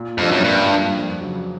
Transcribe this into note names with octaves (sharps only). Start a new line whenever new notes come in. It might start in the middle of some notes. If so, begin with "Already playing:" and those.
Already playing: A#2
F2 G3 A#3 D4 F4
F#2
G2 A#2
G3 A#3 D4 F4
F2
C#3 F#3